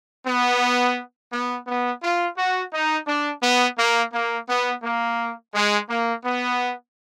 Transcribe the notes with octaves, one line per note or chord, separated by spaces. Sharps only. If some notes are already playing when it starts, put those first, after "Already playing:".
B3
B3
B3
F4
F#4
D#4
D4
B3
A#3
A#3
B3
A#3
G#3
A#3
B3